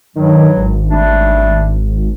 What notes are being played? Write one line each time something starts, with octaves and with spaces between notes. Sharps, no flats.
G2 D#3 F#3
G#1
G3 A3 D4